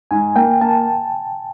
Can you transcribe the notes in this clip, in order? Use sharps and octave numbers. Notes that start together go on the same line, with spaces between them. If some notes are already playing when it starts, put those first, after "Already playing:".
G#2 G#5
A#3 G5
A#3 A5